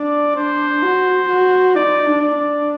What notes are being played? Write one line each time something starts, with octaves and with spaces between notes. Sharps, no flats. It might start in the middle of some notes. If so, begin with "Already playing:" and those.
Already playing: D4 D5
D4 C5
F#4
F#4
D#4 D5
D4
D5
D4